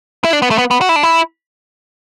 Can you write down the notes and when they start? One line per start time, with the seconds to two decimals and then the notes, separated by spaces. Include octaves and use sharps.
0.24 E4
0.33 D4
0.42 B3
0.51 A3
0.58 B3
0.71 B3
0.81 F#4
0.89 E4
0.96 D4
1.03 E4